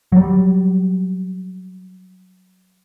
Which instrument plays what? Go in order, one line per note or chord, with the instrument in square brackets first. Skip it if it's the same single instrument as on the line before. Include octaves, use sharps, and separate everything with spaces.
[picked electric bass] F#3 G3